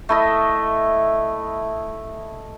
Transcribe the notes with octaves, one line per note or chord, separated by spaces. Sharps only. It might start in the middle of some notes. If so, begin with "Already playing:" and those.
A3 E4 D#5